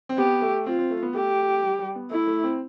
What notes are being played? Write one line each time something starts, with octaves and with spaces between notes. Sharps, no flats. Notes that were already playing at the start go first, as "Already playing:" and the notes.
C4
B3 G4
A3
C4 F4
C4
A3
B3
A3 G4
G3
G3
B3
A3 E4
A3
C4